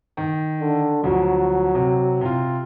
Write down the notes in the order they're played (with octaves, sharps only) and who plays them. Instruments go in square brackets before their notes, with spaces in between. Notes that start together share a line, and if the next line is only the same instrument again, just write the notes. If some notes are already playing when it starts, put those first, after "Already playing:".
[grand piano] D#3
[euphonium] D3
[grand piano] D2 F3 [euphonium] F#3
[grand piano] C3
C3 F4